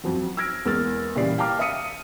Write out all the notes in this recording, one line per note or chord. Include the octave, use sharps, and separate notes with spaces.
F2 F3 F#3
E6 F6 G#6 A#6 D7
E2 G#3 A#3 E6 F6 A6
A#2 C#3 E3 G3 D5 C7
F5 G5 A5 A#5 D6 F6
E5 F5 D#6 C#7 D#7